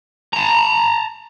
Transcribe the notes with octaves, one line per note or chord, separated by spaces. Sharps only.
A5 A#5